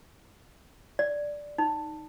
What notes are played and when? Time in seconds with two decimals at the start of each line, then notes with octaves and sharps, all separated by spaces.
0.99 D5
1.58 D#4